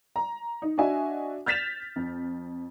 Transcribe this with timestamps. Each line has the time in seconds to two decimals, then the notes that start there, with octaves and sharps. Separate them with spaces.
0.16 A#5
0.62 D#4
0.78 D4 F#4 D#5 E5 G#5
1.46 F6 G6 A6 B6 E7 F7
1.96 F2